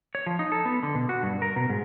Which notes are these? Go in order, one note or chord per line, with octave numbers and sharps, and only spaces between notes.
C#5
F3
D#4
A4
B3
D3
B2
F#4
G2
A#4
B2
G#2